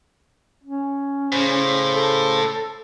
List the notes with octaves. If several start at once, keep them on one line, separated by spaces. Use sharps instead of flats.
C#4
A2 C#3 C5
A4